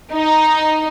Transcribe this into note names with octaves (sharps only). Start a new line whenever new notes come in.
D#4